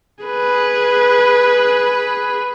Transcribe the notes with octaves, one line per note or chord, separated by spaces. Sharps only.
G#4 B4